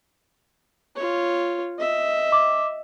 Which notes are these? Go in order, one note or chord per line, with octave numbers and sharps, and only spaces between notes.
F4 C#5
D#5 E5
D6